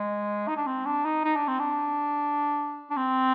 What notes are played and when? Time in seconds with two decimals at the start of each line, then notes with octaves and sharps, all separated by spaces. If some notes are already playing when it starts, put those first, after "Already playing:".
Already playing: G#3
0.48 D#4
0.57 D4
0.66 C4
0.86 D4
1.05 D#4
1.24 D#4
1.36 D4
1.47 C4
1.59 D4
2.90 D4
2.97 C4